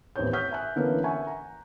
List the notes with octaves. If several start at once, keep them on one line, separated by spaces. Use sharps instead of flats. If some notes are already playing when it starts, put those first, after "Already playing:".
A1 D#2 B3 C4 C#5 G6
C#6 D#6 F6 G6 B6
E5 G#5 F#6
D3 E3 A#3 B3 C#4 B4
E5 F#5 G#5 C#6
A#5